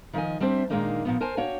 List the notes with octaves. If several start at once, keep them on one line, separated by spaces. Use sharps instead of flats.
D#3 F3 A#4 D#5 G#5
G3 C4 D4 C5 E5
A#2 D#3 G#3 A#3 D4 D#4
A#2 F3 B3
A#4 C5 G#5 A5
A#3 D4 F#4 C#5 G5